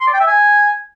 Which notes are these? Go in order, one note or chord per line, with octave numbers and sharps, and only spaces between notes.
C6
D5
G5
E5
G#5